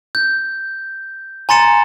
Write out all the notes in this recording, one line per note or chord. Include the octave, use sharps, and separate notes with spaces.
G6
G#5 A#5 C6 A6 C#7 E7